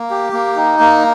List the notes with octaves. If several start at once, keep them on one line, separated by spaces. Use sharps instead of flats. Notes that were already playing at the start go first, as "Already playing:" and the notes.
Already playing: A#3
G4
A#3
D#4
A#3